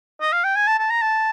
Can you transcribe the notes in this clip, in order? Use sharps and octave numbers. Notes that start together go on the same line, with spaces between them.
D#5
F5
G5
G#5
A5
A5
A#5
A5